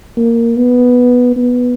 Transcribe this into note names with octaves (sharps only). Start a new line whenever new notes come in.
A#3
B3
B3